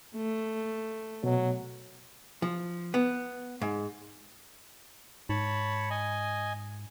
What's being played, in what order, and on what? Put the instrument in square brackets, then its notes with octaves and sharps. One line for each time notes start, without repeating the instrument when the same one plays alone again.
[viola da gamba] A3
[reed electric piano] B2 [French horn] F#3
[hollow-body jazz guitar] F3
B3
G#2
[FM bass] G#2 [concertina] C#5 A5 B5
[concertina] D#5 G#5